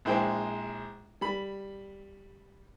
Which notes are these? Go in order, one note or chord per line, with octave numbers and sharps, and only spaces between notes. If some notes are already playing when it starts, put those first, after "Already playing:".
A#1 G#3 E4 C5 G5
G3 B5